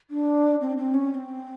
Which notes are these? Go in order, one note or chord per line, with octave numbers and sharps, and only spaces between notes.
D4
C4
C4
C#4
C#4
C4